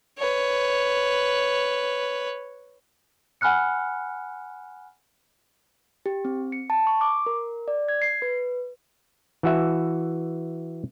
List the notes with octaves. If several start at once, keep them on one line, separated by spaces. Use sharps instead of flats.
B4 C#5
F#5 G#5 B5 F6 F#6 C#7
G4
C4
C#7
A5
C#6
D6
A#4
D5
G#6
C7
B4
E3 F#4 E5